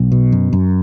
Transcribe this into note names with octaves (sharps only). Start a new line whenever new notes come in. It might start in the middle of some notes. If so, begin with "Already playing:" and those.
Already playing: B1
B2
F#2
F#2